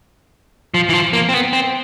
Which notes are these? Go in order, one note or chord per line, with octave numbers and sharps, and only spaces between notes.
F3
E3
F3
A#3
C4
B3
C4